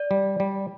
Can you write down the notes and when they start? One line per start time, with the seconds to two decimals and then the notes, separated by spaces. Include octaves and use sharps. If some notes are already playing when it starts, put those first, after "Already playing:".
Already playing: D5
0.11 G3
0.40 G3